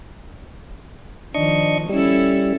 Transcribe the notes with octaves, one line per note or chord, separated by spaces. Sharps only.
D#3 F3 D4 D#5 C#6
G3 C#4 E4 A4